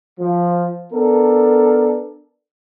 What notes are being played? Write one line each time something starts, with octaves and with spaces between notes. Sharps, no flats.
F3
B3 D4 A4 A#4